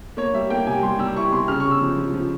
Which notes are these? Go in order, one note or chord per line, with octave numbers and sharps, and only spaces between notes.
A#3 C#5
G3 E5
A#3 G5
C3 G#5
G3 C6
G3 E6
E4 C#6
C3 C6
C#3 F6
C#3 C#6
E6
F3
F3
F3